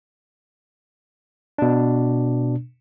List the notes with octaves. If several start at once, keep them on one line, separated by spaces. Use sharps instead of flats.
B2 D4